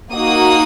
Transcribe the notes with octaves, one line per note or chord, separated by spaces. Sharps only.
A#3 D#4 F#4 D#6